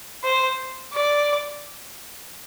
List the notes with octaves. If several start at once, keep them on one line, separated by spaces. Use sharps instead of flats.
C5
D5